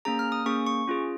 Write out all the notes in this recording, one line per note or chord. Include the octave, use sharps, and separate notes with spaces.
A#3 C#4 G#4 A#5
F6
D#6
A#3 C#4 G#4 C#6
C#6
C#4 F4 G#4